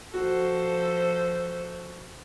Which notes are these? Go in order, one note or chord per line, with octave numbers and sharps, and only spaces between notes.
F3 F#4 A4 C5